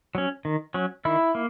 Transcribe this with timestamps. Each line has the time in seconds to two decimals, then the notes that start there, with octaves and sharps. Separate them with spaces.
0.15 F#3 C#4
0.45 D#3
0.74 F#3 C#4
1.05 D#3 E4
1.35 A#3